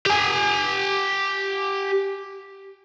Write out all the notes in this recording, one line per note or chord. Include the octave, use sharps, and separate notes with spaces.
G4 G#5